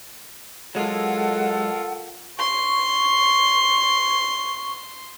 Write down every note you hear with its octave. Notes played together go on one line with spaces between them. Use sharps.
F#3 G#3 F4 A4 A#4 F#5
C6 C#6